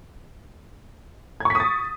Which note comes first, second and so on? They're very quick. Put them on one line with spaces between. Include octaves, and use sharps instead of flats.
G#6 C#6 B6 D#6 A6